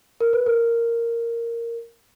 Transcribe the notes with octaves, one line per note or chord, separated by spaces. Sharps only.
A#4
B4
A#4